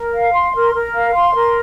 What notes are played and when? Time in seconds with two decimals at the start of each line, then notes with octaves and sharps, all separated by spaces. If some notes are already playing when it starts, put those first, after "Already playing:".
Already playing: A#4
0.13 F5
0.33 C6
0.53 A#4
0.74 A#4
0.94 F5
1.14 C6
1.34 A#4